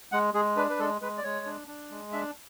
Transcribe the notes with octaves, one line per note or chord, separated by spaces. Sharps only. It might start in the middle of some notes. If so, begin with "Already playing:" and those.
G#3 F#5
G#3 G#4
D4 B4
B4
G#3 A4
G#3 B4
D5
G#3 C#5
D4
D4
G#3
D4 E5